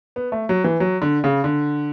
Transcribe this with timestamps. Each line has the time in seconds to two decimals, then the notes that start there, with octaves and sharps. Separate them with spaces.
0.16 B3
0.32 A3
0.49 F#3
0.64 E3
0.80 F#3
1.02 D3
1.24 C#3
1.44 D3